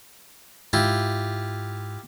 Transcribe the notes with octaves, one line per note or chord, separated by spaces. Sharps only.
G#2 E4 F4 G4